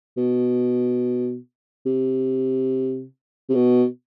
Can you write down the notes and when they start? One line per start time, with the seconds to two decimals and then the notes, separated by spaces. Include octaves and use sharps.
0.17 B2
1.86 C3
3.49 C3
3.54 B2